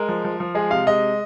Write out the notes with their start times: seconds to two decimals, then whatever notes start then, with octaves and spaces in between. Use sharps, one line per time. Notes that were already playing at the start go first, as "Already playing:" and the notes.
Already playing: G#3 A#4
0.09 F3
0.24 F3
0.40 F3
0.55 G#3 G#4
0.71 C3 F5
0.87 G#3 D#5